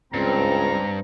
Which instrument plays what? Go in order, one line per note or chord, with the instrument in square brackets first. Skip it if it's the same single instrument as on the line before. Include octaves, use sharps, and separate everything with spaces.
[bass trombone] C#2 [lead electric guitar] G2 [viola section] C4 [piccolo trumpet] A#5